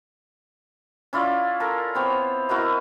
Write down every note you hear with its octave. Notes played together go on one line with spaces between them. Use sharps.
C#4 E4 F4 D5
A4 A#4
B3 C4 C#5
E4 F#4 A#4 D#5